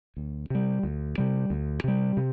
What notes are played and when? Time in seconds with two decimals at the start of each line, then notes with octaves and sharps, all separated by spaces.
0.17 D2
0.50 C3 G3
0.83 D2
1.18 C3 G3
1.50 D2
1.84 C3 G3
2.17 C3